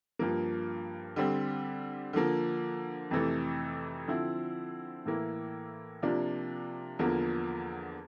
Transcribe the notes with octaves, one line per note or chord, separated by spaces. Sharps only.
G2 F3 A#3
D3 G3 C4
D3 F3 A#3
F2 C3 E3 A3
D3 F3 C4 E4
A2 E3 A#3 E4
C3 F3 A#3 D4 F4
E2 D3 F3 A#3